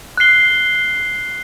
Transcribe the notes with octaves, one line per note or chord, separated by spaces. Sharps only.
F#6 C7 G7